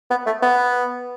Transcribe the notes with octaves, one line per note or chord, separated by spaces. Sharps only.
B3
A3
B3